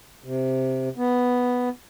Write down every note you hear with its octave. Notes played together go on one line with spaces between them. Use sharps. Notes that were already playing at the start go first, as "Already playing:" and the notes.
C3
B3